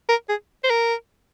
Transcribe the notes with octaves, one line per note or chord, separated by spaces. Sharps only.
A#4
G#4
C5
A#4